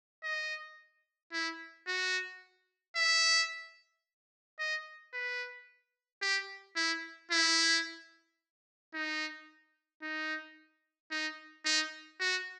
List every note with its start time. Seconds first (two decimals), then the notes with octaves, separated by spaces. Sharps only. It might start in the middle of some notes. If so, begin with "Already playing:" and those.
0.24 D#5
1.32 E4
1.87 F#4
2.96 E5
4.59 D#5
5.13 B4
6.22 G4
6.76 E4
7.31 E4
8.94 D#4
10.02 D#4
11.11 D#4
11.65 D#4
12.20 F#4